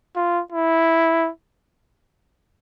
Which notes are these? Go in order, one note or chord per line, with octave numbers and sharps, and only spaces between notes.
F4
E4